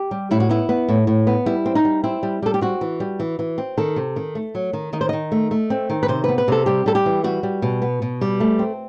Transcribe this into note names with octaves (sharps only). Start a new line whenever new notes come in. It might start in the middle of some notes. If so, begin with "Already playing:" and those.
Already playing: G4
G3
A2 E4
F#4
B3 E4
B3
A2
A2
B3
G3 E4
C4
D#4
G3
C4 E4
G3
G3 A4
G4
C4 F#4
E3
G3
E3
E3
C4
D#3 A4
C3
D#3
A3
F#3
D#3
D#3 D#5
C5
D#3 D#5
A3
A3
C4
D#3
B4
C3 C5
B3 B4
B4
C3 A4
G3 G4
G3 A4
G4
E3
G3 F#4
G3
B2
B3
B2
G3
A3
C4